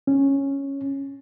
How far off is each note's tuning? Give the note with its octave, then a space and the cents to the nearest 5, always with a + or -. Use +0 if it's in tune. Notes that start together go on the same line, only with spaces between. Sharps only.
C#4 -5